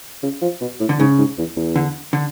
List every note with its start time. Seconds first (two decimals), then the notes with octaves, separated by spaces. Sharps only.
0.23 C#3
0.42 F3
0.61 B2
0.80 A2
0.89 D3
0.99 G#2 C#3
1.18 G#2
1.38 E2
1.56 E2
1.76 D3
2.13 D3